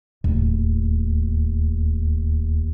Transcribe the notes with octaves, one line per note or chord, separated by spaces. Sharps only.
D1 D#2